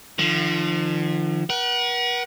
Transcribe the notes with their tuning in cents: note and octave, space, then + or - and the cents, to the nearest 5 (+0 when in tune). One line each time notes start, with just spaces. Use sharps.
D3 +45 F3 -20
B4 -45 F#5 +25